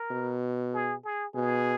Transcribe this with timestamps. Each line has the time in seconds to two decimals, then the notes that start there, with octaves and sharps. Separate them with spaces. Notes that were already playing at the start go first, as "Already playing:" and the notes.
Already playing: A#4
0.11 B2
0.73 G#4
1.05 G#4
1.35 B2 G#4